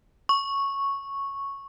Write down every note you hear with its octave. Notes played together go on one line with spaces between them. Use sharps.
C#6